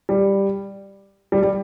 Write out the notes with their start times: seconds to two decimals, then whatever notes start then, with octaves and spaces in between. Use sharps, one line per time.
0.09 G3
1.32 G3
1.43 G3